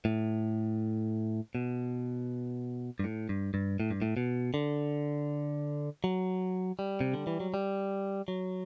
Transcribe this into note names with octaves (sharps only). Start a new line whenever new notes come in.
A2
B2
G2
A2
G2
G2
A2
G2
A2
B2
D3
F#3
G3
C3
D3
E3
F#3
G3
F#3